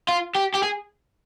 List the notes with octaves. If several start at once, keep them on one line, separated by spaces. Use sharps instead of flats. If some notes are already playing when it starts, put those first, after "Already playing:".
F4
G4
G4
G#4